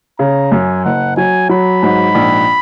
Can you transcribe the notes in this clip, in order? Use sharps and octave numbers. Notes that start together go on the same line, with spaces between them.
C#3 A#5
F#2 G#5
F#1 F#5
F#3 G#5
F#3 B5
G#2
A#1